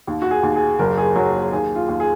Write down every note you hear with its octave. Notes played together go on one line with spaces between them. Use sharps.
D#2
F#4
G#4
D#2
G#4
F#1 A#4
G#4
F#3 F#4
D#2 G#4
F4
D#2
G#4